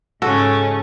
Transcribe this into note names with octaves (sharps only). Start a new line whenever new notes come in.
G#2 C#3 C#4 F#4 A4